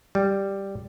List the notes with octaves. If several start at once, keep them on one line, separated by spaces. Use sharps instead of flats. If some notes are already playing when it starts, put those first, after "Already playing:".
G3